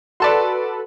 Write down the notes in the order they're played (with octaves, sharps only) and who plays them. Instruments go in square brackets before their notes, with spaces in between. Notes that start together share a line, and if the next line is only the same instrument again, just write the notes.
[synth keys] F#4 A4 B4 [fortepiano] D5 A5 C6